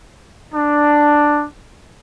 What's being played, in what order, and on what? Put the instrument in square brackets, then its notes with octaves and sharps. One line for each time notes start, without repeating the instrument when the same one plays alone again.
[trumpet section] D4